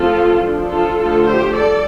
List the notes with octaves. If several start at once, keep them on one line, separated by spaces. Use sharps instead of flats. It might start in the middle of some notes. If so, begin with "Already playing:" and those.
Already playing: F3 A3 C4 F4 A4
F3 D4
F4 A4
D3 F3 A3 F4 A4
G4 C5
G3 A4 D5